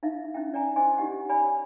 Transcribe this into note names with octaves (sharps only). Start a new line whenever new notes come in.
D#4 E4 E5 F5
C#4 D#4 E4 E5 G5
D5 G5 G#5 A#5
E4 C5 D#5 G#5 C6 D6
D#4 E4 G4 D#5 F#5
C#5 D5 G#5 B5